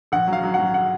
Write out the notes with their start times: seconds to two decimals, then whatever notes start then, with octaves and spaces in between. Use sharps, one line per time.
0.12 A#1 F#5
0.28 F#3
0.33 F5
0.43 F#3
0.54 F#5
0.59 F#3
0.74 F#5